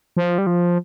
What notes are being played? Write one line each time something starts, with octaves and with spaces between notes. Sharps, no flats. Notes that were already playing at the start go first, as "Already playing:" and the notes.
F3
G3
F3